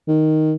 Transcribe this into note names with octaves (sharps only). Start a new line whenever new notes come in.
D#3